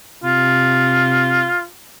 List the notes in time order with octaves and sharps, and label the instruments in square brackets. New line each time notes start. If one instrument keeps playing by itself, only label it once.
[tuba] C3 [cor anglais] F4